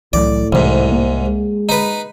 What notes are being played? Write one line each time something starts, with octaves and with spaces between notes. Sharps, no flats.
C2 A2 E3 F#3 D5
C2 G#2 C3 E3 G3
A#3
G#3
D#4 B4